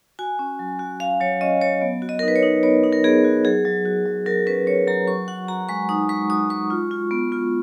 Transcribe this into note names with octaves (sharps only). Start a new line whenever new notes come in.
F#4 G#5
C#4
F#3
F#4
F#4 F5
F#3 C#5
C#4 D#5
F#3 C#5
B3
F#4
D#5
A#4
D#4
B4
C#5
D#4
B3 C#5
D#4
A#4
B3 G#4
F#4
F#3 G#4
F#3
F#4
F#3
F#3 A#4
C#4 B4
C#4 C#5
F#3 A#5
F#4 C#6
F#4 F#5
F#4 A#5
G#3 C#6
D#4 D#6
G#3 C#6
F#4 D#6
G#3 C#6
F4
F4
B3
F4